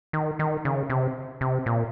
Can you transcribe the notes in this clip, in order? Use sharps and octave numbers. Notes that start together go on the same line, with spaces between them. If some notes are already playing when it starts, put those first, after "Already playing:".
D#3
D#3
C#3
C3
C3
A#2